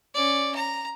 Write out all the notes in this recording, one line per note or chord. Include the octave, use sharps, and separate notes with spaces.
C#4 D5
A#5